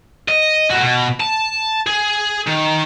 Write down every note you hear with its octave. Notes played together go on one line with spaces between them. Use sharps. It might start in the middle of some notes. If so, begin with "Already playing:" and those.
D#5
A2 F#4
B2
A5
G#4
D#3